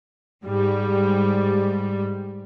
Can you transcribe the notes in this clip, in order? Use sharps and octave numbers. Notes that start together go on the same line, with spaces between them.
G#2 G3